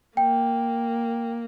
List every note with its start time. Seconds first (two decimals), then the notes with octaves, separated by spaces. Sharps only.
0.17 A#3 G5